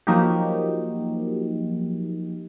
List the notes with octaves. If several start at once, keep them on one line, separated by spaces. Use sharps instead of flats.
F3 F#3 A#3 D#4 F#4 G4